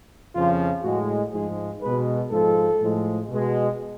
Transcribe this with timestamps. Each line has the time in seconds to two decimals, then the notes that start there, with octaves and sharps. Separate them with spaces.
0.33 F2 C#3 F3 F4
0.83 A2 G#3 F#4
1.32 G#2 F3 G#3 G#4
1.82 B2 G#3 B4
2.31 G#2 F3 G#3 A4
2.80 A2 F3 G#3
3.29 B2 G#3